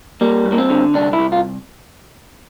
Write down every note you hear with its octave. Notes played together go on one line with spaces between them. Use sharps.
G3 A#3
G2
A#3
C4
D3
C2 D4
E4
C2
F4